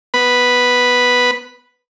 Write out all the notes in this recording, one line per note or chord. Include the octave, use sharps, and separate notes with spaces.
B3 B4 B5